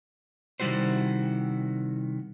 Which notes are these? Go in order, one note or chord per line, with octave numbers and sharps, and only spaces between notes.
C3 D#3 G3 E4 F#4 C5